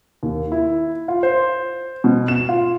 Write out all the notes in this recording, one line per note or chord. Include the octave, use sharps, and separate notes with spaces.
D#2
E4
F4
C5
B2
E7
F4